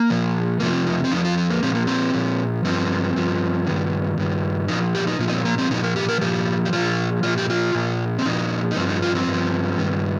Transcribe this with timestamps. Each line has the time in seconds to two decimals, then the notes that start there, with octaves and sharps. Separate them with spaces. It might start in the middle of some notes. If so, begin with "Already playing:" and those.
Already playing: A#3
0.10 A#2 F3
0.60 F2 C3 F3 A#3
0.73 C4
0.86 D#4
1.04 C4
1.11 F2 C3 F3 D#4
1.25 F4
1.38 C4
1.50 A#3
1.63 A#2 F3 C4
1.75 A#3
1.87 C4
2.14 A#2 F3
2.65 G2 F3 C4
3.16 G2 F3
3.67 G2 D#3
4.18 G2 D#3
4.68 A#2 F3 D#4
4.95 G4
5.07 D#4
5.19 A#2 F3 F4
5.28 D#4
5.32 C4
5.45 A#3
5.58 C4
5.71 A#2 F3 D#4
5.83 A#4
5.96 G4
6.09 A#4
6.21 A#2 F3 G4
6.65 G4
6.73 A#2 F3 F4
7.23 A#2 F3 F4
7.38 G4
7.50 F4
7.75 A#2 F3
8.18 C4
8.25 A#2 F3 D#4
8.71 D#4
8.76 G2 F3 C4
8.89 D#4
9.02 F4
9.15 C4
9.27 G2
9.32 F3
9.79 G2 D#3